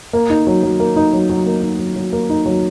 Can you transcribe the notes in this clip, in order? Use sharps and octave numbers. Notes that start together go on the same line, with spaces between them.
A#3
D#4
F#3
F#3
A#3
D#4
F#3
F#3
A#3
D#4
F#3
F#3
A#3
D#4
F#3